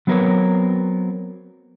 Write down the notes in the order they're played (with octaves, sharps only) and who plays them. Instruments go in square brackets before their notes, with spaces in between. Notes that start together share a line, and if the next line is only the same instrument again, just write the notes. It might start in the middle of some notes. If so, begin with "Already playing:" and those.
[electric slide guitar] F#3 B3 C4 A#4 B4 C#5